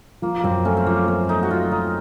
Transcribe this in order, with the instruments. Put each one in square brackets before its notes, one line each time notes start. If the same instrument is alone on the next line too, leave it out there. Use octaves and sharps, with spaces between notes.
[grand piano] F3 [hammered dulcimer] A#3
[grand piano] F#2 [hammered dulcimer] A#3 C4
[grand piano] A3 [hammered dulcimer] C#4
[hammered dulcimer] C4
[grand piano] F3 [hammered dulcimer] A#3
[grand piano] A3 [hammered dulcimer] A#3
[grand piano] A3 [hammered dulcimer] D#4
[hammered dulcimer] F#4
[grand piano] F3 [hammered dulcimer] F4
[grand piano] F3 [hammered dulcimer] D#4